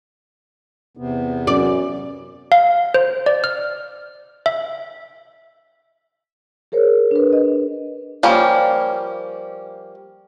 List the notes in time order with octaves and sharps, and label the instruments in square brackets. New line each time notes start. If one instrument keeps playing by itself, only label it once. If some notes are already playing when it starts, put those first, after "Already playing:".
[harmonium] E2 C3 B3
[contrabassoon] F#2 [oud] D5
[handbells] F5
C5
D5
F6
E5
[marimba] G#4 A#4 C5 C#5
D4 B4
D#5
[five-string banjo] F3 G3 A#3 C#4